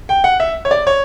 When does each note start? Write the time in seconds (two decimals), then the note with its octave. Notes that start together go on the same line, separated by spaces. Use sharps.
0.09 G5
0.24 F#5
0.40 E5
0.65 C#5
0.71 D5
0.87 C#5